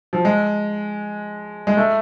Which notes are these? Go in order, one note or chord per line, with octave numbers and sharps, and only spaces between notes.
F3
G#3
G#3
A3